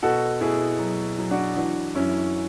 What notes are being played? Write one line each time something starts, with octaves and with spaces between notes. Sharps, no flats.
B2 F#4 A4
B2 E4 G#4
F#3
F#3
D4 F#4
E3 D4 F#4
F#2 C#4 E4